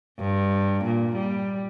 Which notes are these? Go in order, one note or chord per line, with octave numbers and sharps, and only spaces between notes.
G2
A#2
G3